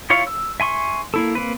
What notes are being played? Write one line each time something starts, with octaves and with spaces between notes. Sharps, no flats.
E4 F4 C#5 F5
E6
E5 G#5 C6 C#6
A#3 E4 A4
A#3 C4 B4